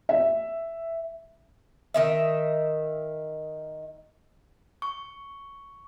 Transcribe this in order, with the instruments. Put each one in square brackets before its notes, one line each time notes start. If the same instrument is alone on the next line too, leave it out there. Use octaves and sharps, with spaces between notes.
[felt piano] E5
[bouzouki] D#3 D#5 E5
[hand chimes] C#6